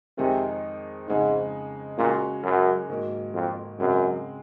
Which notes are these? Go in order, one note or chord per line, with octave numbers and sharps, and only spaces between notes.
F2 C3 D#3 G#3 D#4 G#4
F2 G#2 C#3 G#3 D#4 G#4
A#2 C#3 G#3 C#4 F#4
F#2
G#2 D#3 F#3 A#3
F2
F#2 C#3 G#3 C4